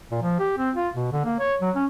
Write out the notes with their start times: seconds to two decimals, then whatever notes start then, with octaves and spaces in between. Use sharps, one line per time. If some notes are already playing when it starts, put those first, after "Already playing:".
0.11 A#2
0.22 F3
0.39 G4
0.58 C4
0.75 F4
0.95 B2
1.12 D3
1.25 A#3
1.39 C#5
1.61 F#3
1.75 C#4